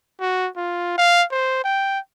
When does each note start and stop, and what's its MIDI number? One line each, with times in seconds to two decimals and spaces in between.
0.20 0.49 66
0.56 0.96 65
0.98 1.24 77
1.31 1.63 72
1.64 1.99 79